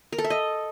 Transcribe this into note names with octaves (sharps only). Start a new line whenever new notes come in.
A#4
A4
E5
D#5